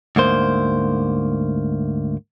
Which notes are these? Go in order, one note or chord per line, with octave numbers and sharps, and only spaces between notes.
D2 G#2 A#3 C5